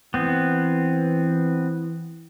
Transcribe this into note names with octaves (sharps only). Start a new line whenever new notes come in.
E3 B3 C4